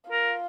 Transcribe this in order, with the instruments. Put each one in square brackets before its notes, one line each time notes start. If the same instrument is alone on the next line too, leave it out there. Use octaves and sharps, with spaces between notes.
[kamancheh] F4 [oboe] A#4